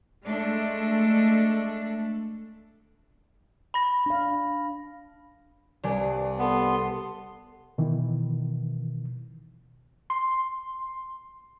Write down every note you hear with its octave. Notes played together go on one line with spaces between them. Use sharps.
G#3 A3 D4 A4
B5 A#6
D4 F5
C2 G2 D5 G#5
B3 A4 C6
B2 D#3 E3
C6